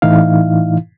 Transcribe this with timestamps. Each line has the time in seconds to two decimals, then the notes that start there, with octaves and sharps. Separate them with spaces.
0.02 A2 E3 D#4 E4 F5